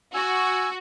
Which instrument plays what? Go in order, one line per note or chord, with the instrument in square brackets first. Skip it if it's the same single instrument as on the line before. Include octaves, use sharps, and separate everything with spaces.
[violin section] F#4 [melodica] G#5 E6